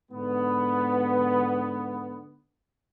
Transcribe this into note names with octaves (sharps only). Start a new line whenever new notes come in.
G#2 D3 B3